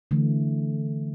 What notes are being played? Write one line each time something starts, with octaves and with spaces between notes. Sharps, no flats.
D3 E3 A3